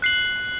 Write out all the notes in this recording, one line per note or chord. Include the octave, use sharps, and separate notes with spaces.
F#6 C7 F#7